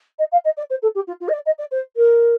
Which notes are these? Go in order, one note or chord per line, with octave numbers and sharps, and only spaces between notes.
D#5
F5
D#5
D5
C5
A4
G4
F4
F4
D#5
D5
D#5
D5
C5
A#4